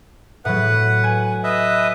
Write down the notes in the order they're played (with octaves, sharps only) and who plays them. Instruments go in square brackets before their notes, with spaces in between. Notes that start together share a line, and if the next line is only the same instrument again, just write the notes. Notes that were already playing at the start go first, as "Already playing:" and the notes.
[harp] A2 F#3 [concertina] B4 F#5
[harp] G#5
[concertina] B4 D#5 E5